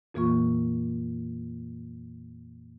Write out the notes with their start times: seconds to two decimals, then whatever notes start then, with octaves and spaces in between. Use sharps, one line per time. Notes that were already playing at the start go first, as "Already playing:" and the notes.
0.14 F2 A#2 E3 A#3 F4 C#6